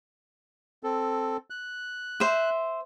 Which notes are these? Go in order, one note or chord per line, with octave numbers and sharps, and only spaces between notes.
C4 A4
F#6
C5 E5